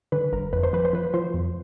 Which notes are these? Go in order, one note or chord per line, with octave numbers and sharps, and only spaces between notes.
D3 B4
G1 A#4
F2 B4
C5
F3 B4
C5
F3 B4
F3 C5
F2